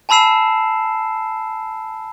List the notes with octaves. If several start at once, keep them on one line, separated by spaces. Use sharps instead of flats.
G#5 A5 B5 E6 C7 E7